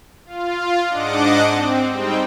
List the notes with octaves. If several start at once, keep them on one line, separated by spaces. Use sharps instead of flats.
F4
G#2 D4 D#5 F#5 D6
C4
G3 G#3 C4 D#4 G5